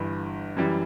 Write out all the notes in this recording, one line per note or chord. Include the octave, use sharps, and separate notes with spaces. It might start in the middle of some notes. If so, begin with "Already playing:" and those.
Already playing: G1 G2 E3
F#2 E3 G3